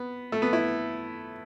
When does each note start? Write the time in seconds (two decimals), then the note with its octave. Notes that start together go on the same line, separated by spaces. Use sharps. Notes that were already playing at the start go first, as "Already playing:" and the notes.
Already playing: B3
0.32 A3
0.42 B3
0.53 E4